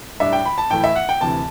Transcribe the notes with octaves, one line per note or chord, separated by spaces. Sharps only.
A2 G3 D4 E5
G5
B5
A5
A2 E3 A3 E4 G5
E5
F#5
G5
D2 C3 E3 A5